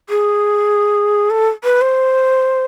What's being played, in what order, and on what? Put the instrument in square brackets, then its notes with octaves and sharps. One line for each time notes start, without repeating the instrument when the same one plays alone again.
[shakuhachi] G#4
A4
B4
C5